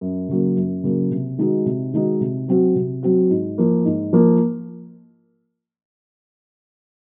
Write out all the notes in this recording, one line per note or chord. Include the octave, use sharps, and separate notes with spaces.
F#2
C#3 F#3 A#3
F#2
C#3 F#3 A#3
C3
D#3 G#3 D#4 F#4
C3
D#3 G#3 D#4 F#4
C3
F#3 C4 F#4
C3
F#3 C4 F#4
G#2
F3 A#3
G#2
F3 A#3